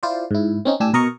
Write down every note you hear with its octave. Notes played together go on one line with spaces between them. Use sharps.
E4 F4 C5 D5
G#2 E4
C4 C#4 D#4
A2 D4 G4 G#5 E6
B2 A#4 D#5 A#5 C#6